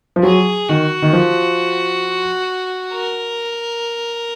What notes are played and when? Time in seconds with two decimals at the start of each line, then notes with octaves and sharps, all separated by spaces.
0.16 F3
0.23 F#3 G#4
0.69 D#3 F#4
1.02 D#3
1.13 F3
2.93 A#4